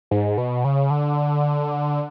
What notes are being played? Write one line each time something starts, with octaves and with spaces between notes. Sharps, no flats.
G#2
B2
C#3
D3